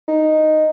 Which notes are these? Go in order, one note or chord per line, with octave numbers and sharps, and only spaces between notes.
D#4